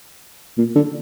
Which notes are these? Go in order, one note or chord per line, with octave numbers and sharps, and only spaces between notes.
A#2
D3